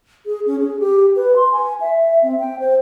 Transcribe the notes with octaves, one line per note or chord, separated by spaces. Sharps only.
G#4
C#4
G#4
G4
B4
C6
G#5
E5
C4
G5
C5